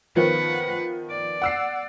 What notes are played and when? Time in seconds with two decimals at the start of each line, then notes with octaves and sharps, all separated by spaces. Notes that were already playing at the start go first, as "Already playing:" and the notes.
0.16 D#3 F3 B3 B4 F#5
1.10 D5
1.42 F#5 E6 C7